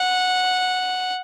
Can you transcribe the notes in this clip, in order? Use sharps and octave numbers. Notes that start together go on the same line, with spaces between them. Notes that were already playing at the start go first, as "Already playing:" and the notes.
Already playing: F#5